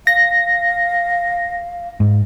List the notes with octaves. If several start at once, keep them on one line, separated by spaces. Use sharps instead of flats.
F5 A#6
G#2